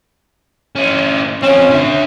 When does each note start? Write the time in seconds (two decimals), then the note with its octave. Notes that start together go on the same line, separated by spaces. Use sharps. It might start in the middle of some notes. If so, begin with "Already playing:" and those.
0.75 C#4 E4
1.42 C4 C#4 F4
1.69 D3 E5